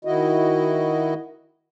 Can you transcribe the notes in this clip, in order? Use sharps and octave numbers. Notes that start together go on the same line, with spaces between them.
D#3 E4 F#4 D#5